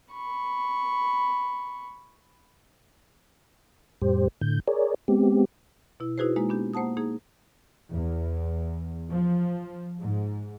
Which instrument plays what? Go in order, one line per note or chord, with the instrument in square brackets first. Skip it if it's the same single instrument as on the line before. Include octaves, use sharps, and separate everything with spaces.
[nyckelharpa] B5 C#6
[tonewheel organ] F2 A2 G3 G4 C5
A2 D3 G6
G#4 A#4 C#5 D5
G#3 B3 C4 G4
[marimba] B2 E4
D#4 E4 F#4 G#4 B4 C5
G#3 A#3 D#4
B3 D4 G4
A#3 C5 F#5 A5 D#6
A#3 D#4 G#4
[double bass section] E2
F3
G#2